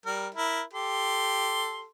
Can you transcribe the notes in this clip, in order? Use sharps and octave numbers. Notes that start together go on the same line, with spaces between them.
G3 A#4
E4 A#4
G4 A4 C6